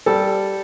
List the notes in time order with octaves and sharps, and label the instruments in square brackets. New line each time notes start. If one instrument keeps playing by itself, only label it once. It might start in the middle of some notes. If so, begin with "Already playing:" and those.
[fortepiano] G3 A4